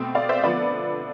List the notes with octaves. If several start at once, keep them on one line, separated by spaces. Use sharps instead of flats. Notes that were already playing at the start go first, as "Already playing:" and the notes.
Already playing: B2 A3 C4
D5 F5
C5 E5
D3 F3 B3 B4 D5